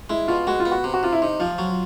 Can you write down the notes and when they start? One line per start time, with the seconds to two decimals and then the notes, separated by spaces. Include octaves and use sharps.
0.10 G#3 E4
0.28 B2 F4
0.47 G#3 F#4
0.60 F4
0.65 B3
0.71 F#4
0.84 C3
0.94 F#4
1.03 C3 F4
1.12 E4
1.22 C3 D#4
1.40 F3 F4
1.58 F#3